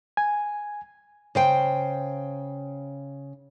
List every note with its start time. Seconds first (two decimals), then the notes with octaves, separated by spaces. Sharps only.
0.17 G#5
1.35 C#3 C5 G5